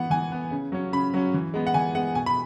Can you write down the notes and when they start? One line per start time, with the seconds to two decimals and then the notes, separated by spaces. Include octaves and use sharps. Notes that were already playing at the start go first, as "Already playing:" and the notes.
Already playing: E3 B3 F#5
0.10 E3 G#5
0.32 B3
0.51 C#3
0.72 F#3 C#4
0.92 C#3 B5
1.14 F#3 C#4
1.34 E3
1.54 G#3 B3
1.67 F#5
1.74 E3 G#5
1.95 G#3 B3 F#5
2.15 B2 G#5
2.26 B5